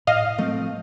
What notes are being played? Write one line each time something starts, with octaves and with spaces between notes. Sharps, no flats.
A2 D#5 F5
F3 A3 C4